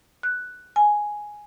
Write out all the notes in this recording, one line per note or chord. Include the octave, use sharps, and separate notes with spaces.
F#6
G#5